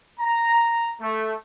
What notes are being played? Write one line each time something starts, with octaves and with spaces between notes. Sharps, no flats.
A#5
A3